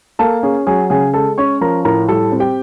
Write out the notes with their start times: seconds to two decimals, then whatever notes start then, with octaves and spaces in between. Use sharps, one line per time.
0.19 A#3 A4 A5
0.43 C#4 G#4 G#5
0.67 F#3 G#4 G#5
0.90 C#3 G#4 G#5
1.14 G#3 A4 A5
1.38 C#4 C#5 C#6
1.61 F3 A#4 A#5
1.85 A2 A#4 A#5
2.08 G3 A4 A5
2.32 C4
2.40 G4 G5